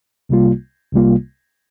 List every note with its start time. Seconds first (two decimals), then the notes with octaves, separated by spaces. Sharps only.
0.29 C2 C3 G3 A#3 F4
0.93 C2 C3 G3 A#3 F4